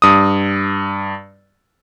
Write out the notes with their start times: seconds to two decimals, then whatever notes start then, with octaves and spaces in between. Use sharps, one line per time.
0.02 G2 D#6